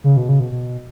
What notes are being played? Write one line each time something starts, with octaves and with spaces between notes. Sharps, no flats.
C#3
B2
C#3
B2
B2